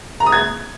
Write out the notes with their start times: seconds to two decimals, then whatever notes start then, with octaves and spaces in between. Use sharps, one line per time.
0.20 A#5
0.26 D#6
0.32 G#6